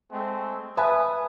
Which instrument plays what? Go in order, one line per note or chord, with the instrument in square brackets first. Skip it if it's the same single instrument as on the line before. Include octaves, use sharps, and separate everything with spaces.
[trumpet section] G#3 A3 C4
[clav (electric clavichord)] B4 [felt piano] E5 G#5 A5 [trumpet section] D#6